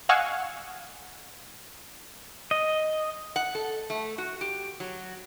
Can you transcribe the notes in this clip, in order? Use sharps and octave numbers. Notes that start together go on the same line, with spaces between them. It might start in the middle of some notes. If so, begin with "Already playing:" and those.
D#5 F5 F#5 G#5 C#6 E6
D#5
F#5
A4
A3
F#4
G4
F#3